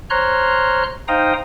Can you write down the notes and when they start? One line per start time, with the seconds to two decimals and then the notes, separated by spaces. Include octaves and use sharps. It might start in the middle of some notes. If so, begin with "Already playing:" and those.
0.10 C5 C#5 A#5 C6 F6 F#6
1.08 D#4 C5 F5 G5 A#5 D#6